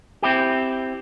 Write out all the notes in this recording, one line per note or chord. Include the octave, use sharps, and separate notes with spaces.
C4 E4 G4